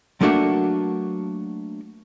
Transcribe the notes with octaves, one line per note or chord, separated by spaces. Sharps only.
F#3 A3 A#3 D4 F#4 E5